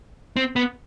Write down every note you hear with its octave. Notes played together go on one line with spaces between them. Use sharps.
C4
B3